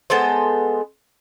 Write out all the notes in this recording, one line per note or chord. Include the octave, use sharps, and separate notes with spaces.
G#3 B3 A4 C5